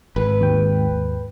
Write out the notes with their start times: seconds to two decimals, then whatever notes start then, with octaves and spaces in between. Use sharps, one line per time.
0.16 G#1 B4
0.41 D#2 G#2 G5